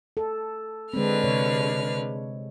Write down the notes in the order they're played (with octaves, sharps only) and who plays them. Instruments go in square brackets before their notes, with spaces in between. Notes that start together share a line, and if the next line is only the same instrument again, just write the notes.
[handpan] A4
[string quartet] D3 B4 F6 [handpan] G#3 C4
[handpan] C3 C#5